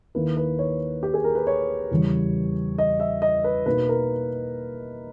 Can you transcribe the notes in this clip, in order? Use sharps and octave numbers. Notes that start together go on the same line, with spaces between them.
D#2 D#3 A#3 E4 B4
B4
C#5
G4
G#4
A#4
B4
C#5
E2 C#3 G3
D#5
E5
D#5
B4
B2 A#3 D#4 B4
A#4